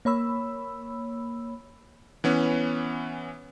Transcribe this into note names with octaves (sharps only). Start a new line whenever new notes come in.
A#3 C#5 B5 E6
E3 B3 C#4